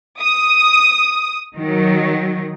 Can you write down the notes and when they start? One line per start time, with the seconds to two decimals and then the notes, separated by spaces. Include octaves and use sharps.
0.21 D#6
1.56 D#3 F#3